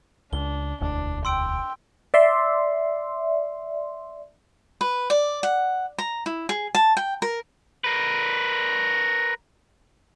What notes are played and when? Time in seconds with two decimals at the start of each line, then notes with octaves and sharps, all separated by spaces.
0.33 C#2 D4 G7
0.81 E1 D2 D4
1.25 G5 C6 E6 D7
2.14 D5 E5 C6
4.81 B4
5.10 D5
5.43 F#5
5.98 A#5
6.26 E4
6.49 G#4
6.75 A5
6.97 G5
7.22 A#4
7.84 A#4 B4